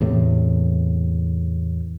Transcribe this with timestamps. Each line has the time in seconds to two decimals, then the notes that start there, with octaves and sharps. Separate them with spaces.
0.01 E2 A2 C3